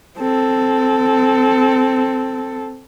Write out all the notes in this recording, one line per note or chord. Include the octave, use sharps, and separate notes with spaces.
C4 A4